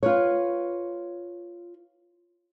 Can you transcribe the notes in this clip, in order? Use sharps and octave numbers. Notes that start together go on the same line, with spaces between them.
F4 B4 C#5